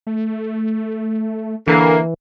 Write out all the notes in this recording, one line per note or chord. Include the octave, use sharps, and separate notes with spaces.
A3
D3 E3 A#3